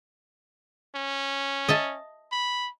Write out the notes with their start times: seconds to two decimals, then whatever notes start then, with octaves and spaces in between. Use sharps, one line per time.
0.95 C#4
1.69 D#5 E5 A5
2.32 B5